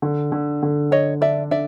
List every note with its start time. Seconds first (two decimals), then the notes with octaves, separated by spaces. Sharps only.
0.02 D3
0.32 D3
0.63 D3
0.91 D3 C#5 D#5
1.21 D4 D5 E5
1.51 D3 D5 E5